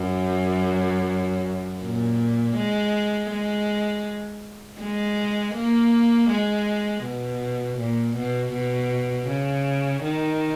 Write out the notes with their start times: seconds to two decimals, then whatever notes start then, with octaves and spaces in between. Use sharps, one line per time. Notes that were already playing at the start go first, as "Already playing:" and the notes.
Already playing: F#2
1.82 A#2
2.56 G#3
3.31 G#3
4.81 G#3
5.55 A#3
6.30 G#3
7.04 B2
7.79 A#2
8.16 B2
8.53 B2
9.28 C#3
10.03 D#3